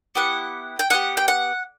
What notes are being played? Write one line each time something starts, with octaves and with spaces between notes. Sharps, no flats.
B3 E4 G4 F#5
G5
B3 E4 G4 F#5
G5
F#5